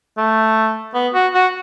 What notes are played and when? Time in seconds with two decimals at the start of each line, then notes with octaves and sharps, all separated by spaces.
0.17 A3
0.94 B3
1.14 F#4
1.34 F#4